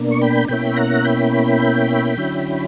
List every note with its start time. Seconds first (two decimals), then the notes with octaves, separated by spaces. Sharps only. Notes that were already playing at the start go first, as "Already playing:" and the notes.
Already playing: B2 A#3 D4
0.11 C#6
0.21 G5 B5
0.48 B2 A#3 C#4 E4 G5 B5
0.77 F#5 A#5
1.05 G5 B5
2.17 D3 F#3 C#4 E4